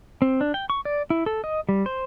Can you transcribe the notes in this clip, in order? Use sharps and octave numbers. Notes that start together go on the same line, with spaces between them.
C4
D4
G5
C#6
D5
E4
A4
D#5
G3
C5